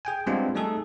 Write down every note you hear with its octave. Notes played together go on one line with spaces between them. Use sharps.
G#4 G5 G#5
G3 G#3 B3 C4 D4 F4
G3 A3 D#4 G#4 A4